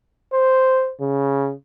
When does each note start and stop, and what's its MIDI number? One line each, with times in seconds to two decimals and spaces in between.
0.33 0.91 72
1.00 1.52 49